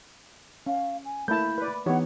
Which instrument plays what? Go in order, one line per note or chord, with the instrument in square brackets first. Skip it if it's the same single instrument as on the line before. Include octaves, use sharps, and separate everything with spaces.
[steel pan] C#4 [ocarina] F5
[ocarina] G#5
[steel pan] A3 A#3 A5 [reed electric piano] E4 G6 [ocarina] B5
[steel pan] B4 D5
[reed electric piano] E3 B3 [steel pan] D#4 G4 C#5 [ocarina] F#5